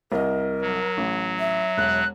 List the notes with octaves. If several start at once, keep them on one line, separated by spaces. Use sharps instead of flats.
C2 A#4 D#5
F#3
A1
E5
E1 F#6